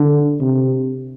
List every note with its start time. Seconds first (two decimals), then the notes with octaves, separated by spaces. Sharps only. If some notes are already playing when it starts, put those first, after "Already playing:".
Already playing: D3
0.41 C3